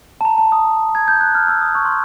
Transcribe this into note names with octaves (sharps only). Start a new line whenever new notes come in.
A5
A#5
A5
D#6
G#6
G6
F#6
F6
E6
D#6
C#6
C6